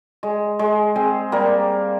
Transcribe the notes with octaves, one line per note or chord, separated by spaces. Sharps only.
G#3
G#3
G#3 C4
G3 A#3